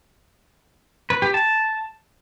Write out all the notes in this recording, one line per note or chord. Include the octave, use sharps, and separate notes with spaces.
B4
G4
A5